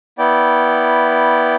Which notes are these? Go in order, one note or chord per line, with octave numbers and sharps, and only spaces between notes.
B3 E4 D5 G5